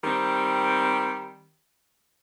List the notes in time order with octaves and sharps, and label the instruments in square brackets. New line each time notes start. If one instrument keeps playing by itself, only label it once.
[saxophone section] D#3 G3 C4